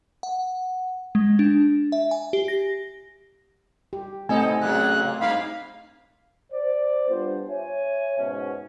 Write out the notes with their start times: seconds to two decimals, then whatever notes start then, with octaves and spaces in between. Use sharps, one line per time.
0.23 F#5
1.15 G#3
1.39 D4
1.92 E5
2.11 G#5
2.33 G4
2.48 A#6
3.93 G4
4.29 A3 B3 C4 D#4 A4 D#5 G#5
4.62 A#2 C#3 F#3 A#3 F#6
5.21 G2 A#3 D#4 F5 B5
6.53 C5 D5
7.09 G3 B3 D4 F4 C5
7.49 C#5 E5 G#5
8.18 G#2 B2 C#4